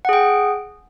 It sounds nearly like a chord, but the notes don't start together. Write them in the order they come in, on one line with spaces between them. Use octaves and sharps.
F#5 G#4 G5